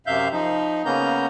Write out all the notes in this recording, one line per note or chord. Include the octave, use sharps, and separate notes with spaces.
F#2 C3 E5 F5 G6
F3 D#4
C#3 A#3 B3 C#4 A#5 G6